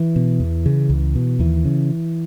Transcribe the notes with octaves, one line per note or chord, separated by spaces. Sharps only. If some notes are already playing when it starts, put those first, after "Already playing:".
Already playing: E3
B2
E2
C#3
C#2
B2
D#2 E3
C#3